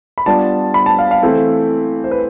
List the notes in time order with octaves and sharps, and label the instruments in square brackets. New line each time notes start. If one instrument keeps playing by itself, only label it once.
[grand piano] B5
[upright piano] G3 B3 D4 F4 [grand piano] A5
[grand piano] B5
A5
F5
F5
[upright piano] E3 A3 C4 E4 [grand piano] A4
[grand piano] C5
B4